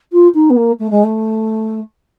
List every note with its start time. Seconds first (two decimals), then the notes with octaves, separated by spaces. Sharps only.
0.12 F4
0.34 D#4
0.50 B3
0.56 A#3
0.79 A3
0.90 G#3
1.03 A3